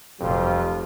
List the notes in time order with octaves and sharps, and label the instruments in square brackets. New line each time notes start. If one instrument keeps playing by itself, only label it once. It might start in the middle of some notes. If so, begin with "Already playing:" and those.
[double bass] F1 [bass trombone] F2 [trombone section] F#3 G3 F4